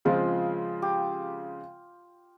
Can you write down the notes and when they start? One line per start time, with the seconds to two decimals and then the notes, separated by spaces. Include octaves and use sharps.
0.05 C#3 F3 G#3 C4 F4
0.82 G4